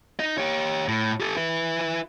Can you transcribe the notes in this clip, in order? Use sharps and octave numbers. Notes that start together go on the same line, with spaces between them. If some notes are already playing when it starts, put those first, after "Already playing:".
D#4 D#5
G4 C#5
A2
G4 A4
E4 B4